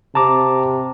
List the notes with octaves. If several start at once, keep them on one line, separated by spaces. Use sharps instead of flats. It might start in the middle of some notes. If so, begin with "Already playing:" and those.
C3 A5 A#5 D6